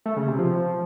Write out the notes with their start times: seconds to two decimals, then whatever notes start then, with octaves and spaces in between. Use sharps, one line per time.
0.06 A3
0.17 C#3
0.28 C3
0.39 F3